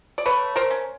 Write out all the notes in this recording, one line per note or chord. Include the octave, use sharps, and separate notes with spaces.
D5
A3 B4 C#5
A#4 C5
C#4